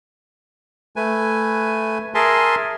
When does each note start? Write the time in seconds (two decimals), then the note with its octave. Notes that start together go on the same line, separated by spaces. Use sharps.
0.96 A3 B4 G#5
2.14 G#4 A#4 E5 G#5 A5 C6